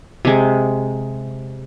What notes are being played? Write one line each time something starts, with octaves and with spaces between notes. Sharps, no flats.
C3 G#3